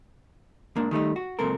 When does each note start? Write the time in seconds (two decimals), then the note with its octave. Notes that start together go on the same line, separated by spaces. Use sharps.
0.76 G#2 A#3 D4
0.91 D#3 G3 A3 D#4
1.16 F#4
1.39 C#2 F#2 A#2 C4 A4 A#4